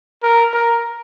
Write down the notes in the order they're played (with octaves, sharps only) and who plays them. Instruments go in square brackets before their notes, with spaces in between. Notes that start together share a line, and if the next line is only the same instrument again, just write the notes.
[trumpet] A#4
A#4